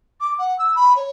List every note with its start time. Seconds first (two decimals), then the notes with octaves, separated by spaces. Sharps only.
0.20 D6
0.38 F#5
0.58 E6
0.76 B5
0.96 C#5